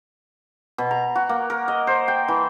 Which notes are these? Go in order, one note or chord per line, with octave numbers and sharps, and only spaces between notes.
B2
A#5
F#4
A#3
A#4
D#5
C5
G5
E3